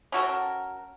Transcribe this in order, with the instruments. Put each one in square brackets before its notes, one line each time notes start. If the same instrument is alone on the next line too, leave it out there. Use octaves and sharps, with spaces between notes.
[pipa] C#4 F#4 A4 A#4